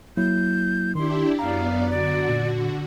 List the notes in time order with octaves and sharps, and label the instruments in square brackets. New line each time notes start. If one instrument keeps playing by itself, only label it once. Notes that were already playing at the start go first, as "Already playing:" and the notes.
[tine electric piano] F#3 A#3 E4 [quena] G6
[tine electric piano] D#3 [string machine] D4 E4 G4 [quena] C6
[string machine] F#2 B3 D5 [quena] F5 [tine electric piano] A#5
[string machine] D3 F#4 [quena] D5
[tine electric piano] A#2